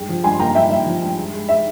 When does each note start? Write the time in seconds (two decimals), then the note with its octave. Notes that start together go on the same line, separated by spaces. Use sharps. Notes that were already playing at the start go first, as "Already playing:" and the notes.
Already playing: G2 G#3 G5
0.09 F3
0.24 G2 G#5 C6
0.39 A#3 G5 A#5
0.55 G2 E5 G5
0.70 G2 E5
0.86 F3
1.02 G2
1.18 G#3
1.34 G#3
1.49 G#3 E5